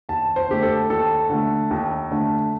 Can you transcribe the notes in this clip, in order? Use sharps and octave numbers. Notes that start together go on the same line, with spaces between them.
D#2 A5
C5
D3 A3 G4
A4
D#2 A4
D3 A3
D#2
D3 A3